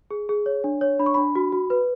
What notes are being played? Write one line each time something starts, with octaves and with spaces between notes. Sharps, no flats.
G#4
G#4
C#5
D4
C#5
D4 B5
C#6
D4 B5
F#4
F#4
B4